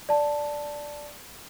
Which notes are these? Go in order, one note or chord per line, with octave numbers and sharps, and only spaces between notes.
D5 A5